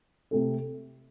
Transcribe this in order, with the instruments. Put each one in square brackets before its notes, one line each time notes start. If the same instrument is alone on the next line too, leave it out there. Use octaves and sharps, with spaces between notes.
[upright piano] C3 A3 C4 A4